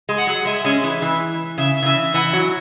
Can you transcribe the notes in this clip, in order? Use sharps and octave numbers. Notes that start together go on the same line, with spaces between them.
G#3
F#5
F#3
G#3 E5
G#3 C#4
E3
E3
C#3 E5
C#3
E3 E5
E3 F#5
F#3